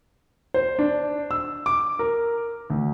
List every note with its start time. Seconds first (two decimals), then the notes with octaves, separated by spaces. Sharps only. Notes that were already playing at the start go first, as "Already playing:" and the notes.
0.54 C5
0.79 D4
1.31 E6
1.66 D6
1.99 A#4
2.70 D2